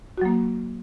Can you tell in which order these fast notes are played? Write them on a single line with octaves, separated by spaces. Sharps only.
F#4 F#3 A#3